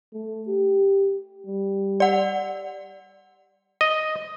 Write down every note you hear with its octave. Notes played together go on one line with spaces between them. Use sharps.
A3
G4
G3
D5 F#5
D#5